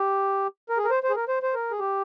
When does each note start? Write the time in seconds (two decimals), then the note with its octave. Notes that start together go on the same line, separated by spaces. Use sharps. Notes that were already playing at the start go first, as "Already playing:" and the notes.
Already playing: G4
0.69 A#4
0.77 G#4
0.85 A#4
0.90 C5
1.03 C5
1.10 G#4
1.16 A#4
1.28 C5
1.43 C5
1.54 A#4
1.71 G#4
1.79 G4